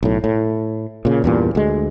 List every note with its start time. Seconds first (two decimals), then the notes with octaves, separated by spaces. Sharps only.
0.03 B1 A2
0.24 A2
1.05 A#2 C#3
1.24 E2 G2 A#2
1.55 D2 G#3